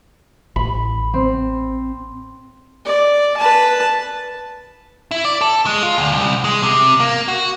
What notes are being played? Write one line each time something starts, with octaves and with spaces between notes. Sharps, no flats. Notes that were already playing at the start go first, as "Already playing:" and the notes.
A1 B5
C4
D5
B4 A5
E4
D5
A4
G#3
F4
D2
C2
G#3
C3
A#3
F#4